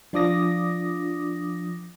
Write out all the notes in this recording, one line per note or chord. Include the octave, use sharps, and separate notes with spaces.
F3 D4 F4 D6 D#6 A#6